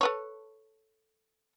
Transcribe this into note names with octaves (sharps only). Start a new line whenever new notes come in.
A4 B4 C#5